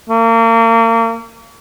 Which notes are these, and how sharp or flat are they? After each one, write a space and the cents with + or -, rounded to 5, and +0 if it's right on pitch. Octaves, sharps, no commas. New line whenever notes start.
A#3 -35